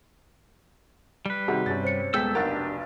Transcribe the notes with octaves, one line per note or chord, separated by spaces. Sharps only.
G3 B4
C3 D#3 F#4 G#4 F#5
G2 C3 C#4 A6
C5 C#5 C#7
D#1 G#3 B3 A4 G5 E6 G6 B6
F1 B1 D4 G4 A#4 F#5 A6